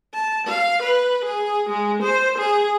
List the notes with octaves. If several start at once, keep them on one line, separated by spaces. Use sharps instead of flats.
A5
F5
B4
G#4
G#3
C5
G#4